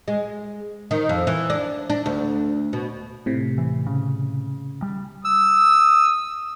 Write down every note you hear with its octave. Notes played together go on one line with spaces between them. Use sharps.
G#3
D#3
F2
E3
D4
D4
D2
B2
A2 C3
E3
C#3
G3
D#6 E6